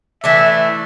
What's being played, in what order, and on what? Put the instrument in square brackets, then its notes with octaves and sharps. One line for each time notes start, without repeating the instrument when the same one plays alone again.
[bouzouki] E3 A3 D4 [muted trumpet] E5